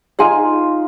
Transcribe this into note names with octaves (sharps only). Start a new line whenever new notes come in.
D#4 F4 G#4 G#5